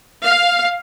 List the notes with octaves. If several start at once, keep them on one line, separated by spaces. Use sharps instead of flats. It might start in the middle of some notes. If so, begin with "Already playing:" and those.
F5